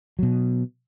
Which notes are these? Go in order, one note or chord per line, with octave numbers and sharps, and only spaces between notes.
B2 F#3